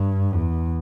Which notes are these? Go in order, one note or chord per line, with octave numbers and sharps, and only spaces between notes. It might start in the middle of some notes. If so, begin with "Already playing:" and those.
Already playing: G2
E2